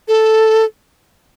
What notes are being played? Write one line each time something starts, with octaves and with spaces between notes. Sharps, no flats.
A4